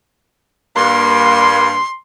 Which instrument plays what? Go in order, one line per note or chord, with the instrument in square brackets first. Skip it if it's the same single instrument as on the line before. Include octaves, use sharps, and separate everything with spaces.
[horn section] G2 A#3 [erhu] C6